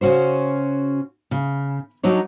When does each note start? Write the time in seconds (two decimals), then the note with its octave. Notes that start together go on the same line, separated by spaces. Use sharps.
0.01 C#3 C#4 F#4 C5
1.31 C#3
2.03 F#3 D4 D#4 C#5